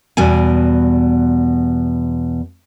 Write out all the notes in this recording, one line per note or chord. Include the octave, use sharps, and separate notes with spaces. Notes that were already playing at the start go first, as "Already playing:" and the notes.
E2 B2 G3 G#5